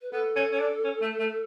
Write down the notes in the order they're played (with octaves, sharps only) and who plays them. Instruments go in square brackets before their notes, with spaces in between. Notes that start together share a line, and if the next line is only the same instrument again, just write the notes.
[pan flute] B4
[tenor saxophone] B3 [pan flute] A4
[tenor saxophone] C#4
C#4
D4
C#4
A3
A3